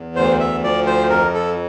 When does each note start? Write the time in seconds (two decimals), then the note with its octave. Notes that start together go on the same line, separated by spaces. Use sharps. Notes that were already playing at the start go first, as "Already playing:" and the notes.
Already playing: E2
0.16 D2 C5
0.40 E5
0.63 F3 D5
0.86 C5
1.10 F2 A#4
1.34 A4